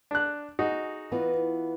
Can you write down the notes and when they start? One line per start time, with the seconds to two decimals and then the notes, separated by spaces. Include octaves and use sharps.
0.11 D4 F#6
0.59 D#4 F#4 G#4 D#5
1.12 E3 B3 F4